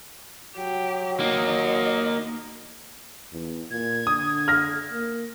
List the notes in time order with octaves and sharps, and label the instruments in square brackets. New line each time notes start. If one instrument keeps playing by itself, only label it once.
[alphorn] F#3 [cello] G4
[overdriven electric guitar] A#3 D#4 [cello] D#5
[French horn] E2
[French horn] A#2 [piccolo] G#6
[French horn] D3 [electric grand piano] D#6
[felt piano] F6 A#6
[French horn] A#3